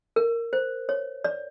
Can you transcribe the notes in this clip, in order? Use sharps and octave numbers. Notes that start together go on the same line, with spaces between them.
A#4
C5
C#5
D5